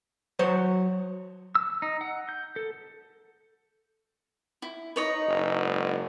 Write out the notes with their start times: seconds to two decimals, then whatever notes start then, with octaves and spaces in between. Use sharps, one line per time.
0.39 F#3 C5 C#5
1.55 E6
1.82 D#4
2.01 F#5
2.29 G6
2.56 A4
4.62 E4
4.96 D#4 B4 C#5 D#5
5.28 F#1
5.60 G#2